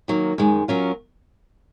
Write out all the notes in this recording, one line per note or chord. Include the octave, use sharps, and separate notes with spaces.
D#3 F#3 A#3
F#2 D#3 G#3
F#3 C#4 F4 A#4